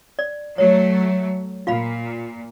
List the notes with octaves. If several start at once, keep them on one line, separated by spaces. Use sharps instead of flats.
D5
F#3 A3 C#5
A#2 F4 F5 B5